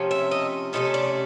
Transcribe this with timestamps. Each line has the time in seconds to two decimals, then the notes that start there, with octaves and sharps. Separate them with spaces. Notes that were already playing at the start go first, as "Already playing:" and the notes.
Already playing: C3 F3 A3 C#4
0.11 E5
0.31 D#5
0.73 C3 F3 A3 C#4 D#5
0.94 D5